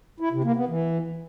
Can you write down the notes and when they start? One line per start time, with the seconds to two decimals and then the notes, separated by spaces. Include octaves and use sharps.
0.20 E4
0.32 C3
0.44 A#3
0.56 B3
0.68 E3